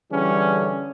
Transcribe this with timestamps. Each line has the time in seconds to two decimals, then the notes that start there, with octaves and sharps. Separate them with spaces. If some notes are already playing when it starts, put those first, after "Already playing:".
0.11 D3 E3 G3 C#4 G#4